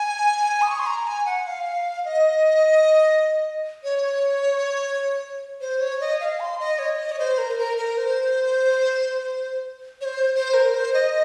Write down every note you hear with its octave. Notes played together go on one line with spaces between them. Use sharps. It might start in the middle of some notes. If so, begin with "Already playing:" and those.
Already playing: G#5
D#6
C#6
C6
A#5
G#5
F#5
F5
D#5
C#5
C5
C#5
D#5
F5
C6
D#5
C#5
D#5
C#5
C5
A#4
C5
A#4
A#4
C5
C#5
C5
C5
A#4
C5
D#5